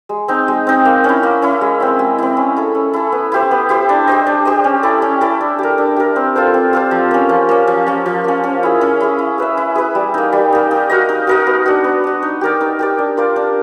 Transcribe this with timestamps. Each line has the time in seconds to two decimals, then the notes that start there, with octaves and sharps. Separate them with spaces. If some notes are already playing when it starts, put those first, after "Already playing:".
0.09 G#3
0.28 C4 D#4
0.48 G#3
0.67 C4 D#4
0.85 A#3
1.04 C#4 E4
1.23 A#3
1.42 C#4 E4
1.61 G#3
1.80 C4 E4
1.99 G#3
2.18 C4 E4
2.37 C#4
2.56 E4 A4
2.75 C#4
2.93 E4 A4
3.12 B3
3.32 E4 G4 C5
3.51 B3
3.69 E4 G4 C5
3.89 D4
4.08 G4 C5 D#5
4.27 D4
4.45 G4 C5 D#5
4.64 C#4
4.83 E4 A4 D5
5.02 C#4
5.21 E4 A4 D5
5.41 D4
5.59 G4 A#4
5.78 D4
5.96 G4 A#4
6.16 C4
6.36 F4 A4 C5
6.54 C4
6.73 F4 A4 C5
6.91 F3
7.11 A#3 C#4
7.29 F3
7.49 A#3 C#4
7.67 F3
7.87 A#3 C#4
8.06 F3
8.24 A#3 C#4
8.44 C#4
8.63 E4 G#4
8.81 C#4
9.00 E4 G#4
9.19 E4
9.38 G#4 B4 E5
9.57 E4
9.75 G#4 B4 E5
9.95 G3
10.14 A#3 D#4
10.32 G3
10.52 A#3 D#4
10.71 D#4
10.90 F#4 A#4 D#5
11.09 D#4
11.27 F#4 A#4 D#5
11.47 B3
11.66 D4 F#4
11.84 B3
12.04 D4 F#4
12.23 D#4
12.41 G4 A#4 D5
12.61 D#4
12.79 G4 A#4 D5
12.99 D4
13.17 F4 A#4 D5
13.36 D4